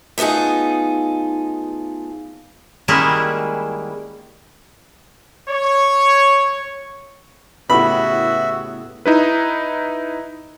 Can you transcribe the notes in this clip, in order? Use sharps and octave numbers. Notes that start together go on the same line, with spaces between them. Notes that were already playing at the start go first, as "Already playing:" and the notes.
A3 B3 D#4 F4 G#4
D#3 G3 G#3 A#3 C#4 E4
C#5
A2 C#3 B3 E4 F#4 G4 E5 B5
D#4 E4 B4